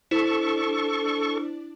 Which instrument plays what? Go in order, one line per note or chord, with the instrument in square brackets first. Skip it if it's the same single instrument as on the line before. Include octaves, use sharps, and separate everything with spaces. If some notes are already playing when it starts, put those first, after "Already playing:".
[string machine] D4 D5 [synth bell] E4 [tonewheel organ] A4 C#6 [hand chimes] C5